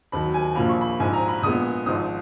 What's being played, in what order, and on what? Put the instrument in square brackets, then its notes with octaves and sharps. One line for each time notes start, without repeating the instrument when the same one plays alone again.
[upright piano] D#2 D#3 F#3 B5
G#5
A#1 A#2 F3 A#3 B5
C#6
B5
A#1 G#2 F3 G#5
A#5
B5
A#1 A#2 G#3 B3 D#6
G#1 G#2 F3 D#6